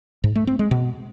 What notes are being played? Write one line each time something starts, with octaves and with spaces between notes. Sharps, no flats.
G#2
A3
C4
G#3
B2